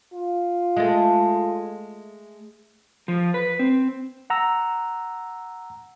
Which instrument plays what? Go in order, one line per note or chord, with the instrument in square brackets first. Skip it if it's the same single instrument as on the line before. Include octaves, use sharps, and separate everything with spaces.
[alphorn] F4
[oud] G#3 A3
[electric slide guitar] F3
B4
C4
[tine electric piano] F#5 A#5 E6